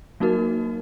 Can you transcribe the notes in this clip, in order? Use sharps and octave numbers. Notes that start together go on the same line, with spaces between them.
F#3 A#3 D#4 F#4 A#4